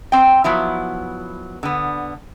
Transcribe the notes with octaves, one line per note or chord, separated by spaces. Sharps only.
C4 G5
F3 F#3 B3 E4
D3 B3